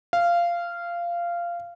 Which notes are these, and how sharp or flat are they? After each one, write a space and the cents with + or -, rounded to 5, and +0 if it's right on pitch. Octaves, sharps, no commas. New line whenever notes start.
F5 -15